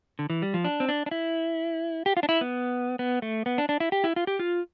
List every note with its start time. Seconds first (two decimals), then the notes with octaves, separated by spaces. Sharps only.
0.19 D3
0.30 E3
0.42 G3
0.54 F3
0.64 D4
0.80 C4
0.89 D4
1.06 D4
1.11 E4
2.06 G4
2.17 F4
2.23 D4
2.29 E4
2.41 B3
2.99 B3
3.22 A3
3.46 B3
3.58 D4
3.69 D4
3.80 E4
3.92 G4
4.04 E4
4.16 F4
4.27 G4
4.39 F4